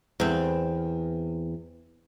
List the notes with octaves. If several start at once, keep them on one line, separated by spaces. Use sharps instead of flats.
E2 C4